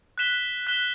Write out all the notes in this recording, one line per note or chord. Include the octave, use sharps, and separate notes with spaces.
F#6 B6 E7 G7
F#6 B6 E7 G7